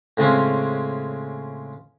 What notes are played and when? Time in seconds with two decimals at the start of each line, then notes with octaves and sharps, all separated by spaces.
0.17 A2 C#3 G#3 C4 C#4